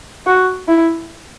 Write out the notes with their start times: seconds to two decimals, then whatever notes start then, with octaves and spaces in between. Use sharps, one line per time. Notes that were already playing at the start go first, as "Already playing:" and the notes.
0.27 F#4
0.68 E4